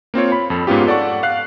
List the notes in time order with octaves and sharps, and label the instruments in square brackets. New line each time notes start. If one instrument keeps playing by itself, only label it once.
[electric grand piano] A#3 C4 F4 C#5
B5
F2 A4
G#2 B3 C#4 F4 G4
A4 D5 F#5 C#6
F5 F#6 C7